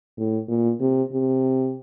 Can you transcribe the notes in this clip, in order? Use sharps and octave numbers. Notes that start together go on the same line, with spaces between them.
A2
A#2
C3
C3